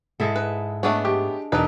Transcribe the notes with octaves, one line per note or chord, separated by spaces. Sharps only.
G#2 G#3 E4 A4
B4
G#3 A3 B3 D4 C#5
G4
E1 D4 D#4 B4